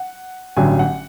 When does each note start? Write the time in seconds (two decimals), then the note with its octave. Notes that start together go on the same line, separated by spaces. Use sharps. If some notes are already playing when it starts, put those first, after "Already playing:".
Already playing: F#5
0.57 A1 G2 D3 F#3 G#5
0.79 F#5